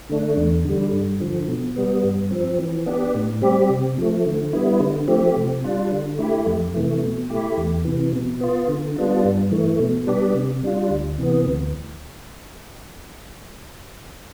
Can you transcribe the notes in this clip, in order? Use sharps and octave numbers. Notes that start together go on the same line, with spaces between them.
D3 A3 D4
E2
D3 G3
G2
D3 F3
B2
G3 B3
G2
F3 C4
E3
B3 D4 G4
A2
G3 C4 G4
C3
F3 A3
D3
G3 B3 E4
D3
F3 A3 C4 G4
C3
G3 D4 F4
D3
A3 E4 G4
F2
C3 E3 A3
B2
A3 E4 G4
E2
C3 E3
B2
B3 F4
D3
G3 B3 D4 F4
G2
E3 A3
B2
G3 B3 D4 G4
C3
G3 D4 F4
D2
C3 E3 B3
D2